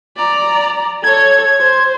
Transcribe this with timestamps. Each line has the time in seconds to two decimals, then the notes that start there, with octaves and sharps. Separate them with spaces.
0.17 D5 A#5
1.04 A4 C#5 G#6
1.60 C5